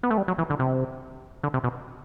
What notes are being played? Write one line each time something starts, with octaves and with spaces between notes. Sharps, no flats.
B3
A3
G3
F#3
E3
D3
C3
D3
C3
B2